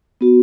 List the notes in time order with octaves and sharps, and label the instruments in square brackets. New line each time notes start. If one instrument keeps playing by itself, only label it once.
[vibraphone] B3 F#4